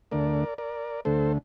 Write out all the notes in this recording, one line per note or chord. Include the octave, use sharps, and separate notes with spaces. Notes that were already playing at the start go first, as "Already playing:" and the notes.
D2 D3 A3 A#4 D5
A#4 D5
D2 D3 A3 A4 C5